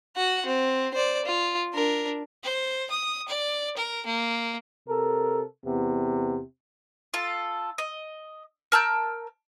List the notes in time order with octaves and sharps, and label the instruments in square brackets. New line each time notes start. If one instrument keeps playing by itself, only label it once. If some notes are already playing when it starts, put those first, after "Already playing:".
[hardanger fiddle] F#4 F#5
C4
C5 D5
F4
D4 A#4
[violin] C5
D#6
D5
A#4
A#3
[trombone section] C3 A4 A#4
E2 C3 B3
[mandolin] F4 A4
D#5
A#4 A5 E6 G6